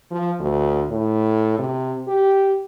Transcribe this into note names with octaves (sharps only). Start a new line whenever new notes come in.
F3
D2
A2
C3
G4